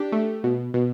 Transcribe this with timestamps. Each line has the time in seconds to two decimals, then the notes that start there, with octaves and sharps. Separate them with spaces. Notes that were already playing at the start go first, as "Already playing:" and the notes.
Already playing: D4 G4
0.12 A3
0.44 B2
0.74 B2